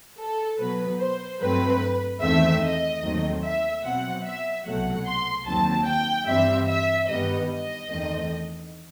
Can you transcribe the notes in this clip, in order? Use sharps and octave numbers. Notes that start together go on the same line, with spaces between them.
A4
B2 F#3 B3 B4
C5
G2 F#3 A3 C4 B4
E2 D#3 A3 C4 E5
D#5
D#2 D#3 F#3 A3 C4
E5
B2 F#3 C4 F#5
E5
C2 B2 F#3 A3 F#5
C6
D#2 D#3 F#3 C4 A5
G5
G2 E3 G3 C4 E5
E5
G2 D#3 G3 B3 D#5
D#5
E2 D#3 A3 C4